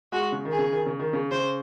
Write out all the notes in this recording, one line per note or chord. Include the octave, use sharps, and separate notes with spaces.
G#3 F#4
C#3
D#3
G#4
C#3
D#3
C#3
D#3
C#3
C#3 C5